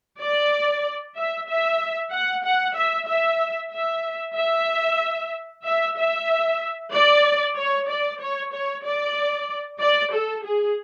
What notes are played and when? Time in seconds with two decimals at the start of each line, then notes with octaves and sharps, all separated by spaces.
0.20 D5
1.17 E5
1.48 E5
2.13 F#5
2.44 F#5
2.77 E5
3.08 E5
3.73 E5
4.37 E5
5.65 E5
5.97 E5
6.93 D5
7.56 C#5
7.89 D5
8.21 C#5
8.53 C#5
8.85 D5
9.80 D5
10.13 A4
10.45 G#4